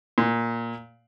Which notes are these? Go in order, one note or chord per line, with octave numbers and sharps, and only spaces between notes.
A#2